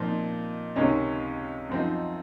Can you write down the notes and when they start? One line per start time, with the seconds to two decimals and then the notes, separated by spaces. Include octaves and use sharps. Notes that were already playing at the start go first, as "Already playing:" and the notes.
Already playing: A#2 F3 C4 D#4
0.76 C#2 C3 D#3 G#3 C#4
1.69 F#2 F3 C4 D#4